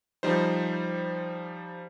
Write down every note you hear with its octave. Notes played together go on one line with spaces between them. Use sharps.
F3 G3 D#4 C5